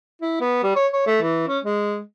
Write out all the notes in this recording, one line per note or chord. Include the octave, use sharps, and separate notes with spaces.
E4
B3
G3
C#5
C#5
A3
E3
C#4
G#3